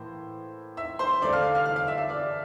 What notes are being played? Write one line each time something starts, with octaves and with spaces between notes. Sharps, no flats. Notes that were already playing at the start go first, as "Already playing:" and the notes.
Already playing: A2 E3 A#3 C5
E5 E6
C5 C6
D3 A3 D5 D6
F5 F6
F5 F6
F5 F6
F5 F6
F5 F6
E5 E6
E5 E6
D5 D6